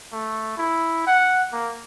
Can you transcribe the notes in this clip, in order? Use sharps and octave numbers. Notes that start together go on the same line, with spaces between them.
A3
E4
F#5
A#3